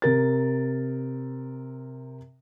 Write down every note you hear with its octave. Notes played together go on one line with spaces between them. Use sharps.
C3 A#4 A6